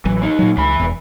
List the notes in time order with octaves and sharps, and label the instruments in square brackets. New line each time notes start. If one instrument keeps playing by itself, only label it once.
[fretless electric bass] A1 F#3 [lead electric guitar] E3
[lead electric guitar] A#3 D#4
[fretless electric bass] A#2 F#3
[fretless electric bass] C#2 [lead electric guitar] E3 B5
[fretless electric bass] E1 E2